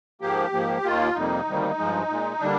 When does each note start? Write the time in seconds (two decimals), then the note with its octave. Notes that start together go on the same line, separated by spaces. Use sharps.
0.21 G#2 F3 A#3 G4
0.53 G#2 F3 A#3
0.84 D#2 D#3 A#3 F4
1.15 F2 C3 G3 A#3 D#4
1.46 D2 C3 D#3 G3 A#3
1.78 G2 F3 G#3
2.09 A#2 G#3
2.40 D3 G3 A#3 D4